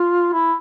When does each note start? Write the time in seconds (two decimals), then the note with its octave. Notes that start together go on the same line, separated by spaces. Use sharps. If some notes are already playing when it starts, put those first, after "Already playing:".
Already playing: F4
0.33 E4